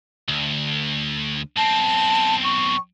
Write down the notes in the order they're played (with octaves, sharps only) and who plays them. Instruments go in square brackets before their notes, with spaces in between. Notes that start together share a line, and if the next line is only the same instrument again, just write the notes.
[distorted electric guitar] D2
[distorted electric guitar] B1 C4 [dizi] A5
[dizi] C#6